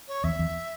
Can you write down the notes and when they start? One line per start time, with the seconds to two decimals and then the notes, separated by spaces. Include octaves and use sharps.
0.08 C#5
0.24 E2 E5
0.39 E2